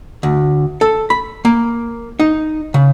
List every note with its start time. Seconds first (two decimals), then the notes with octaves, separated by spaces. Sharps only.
0.23 D2
0.81 A4
1.10 B5
1.45 A#3
2.20 D#4
2.74 C#3